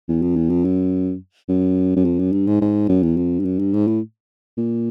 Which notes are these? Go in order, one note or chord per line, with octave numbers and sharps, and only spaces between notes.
E2
F2
E2
F2
F#2
F#2
F#2
F2
F#2
G2
G#2
G#2
F#2
E2
F2
G2
F#2
G2
G#2
A2
A#2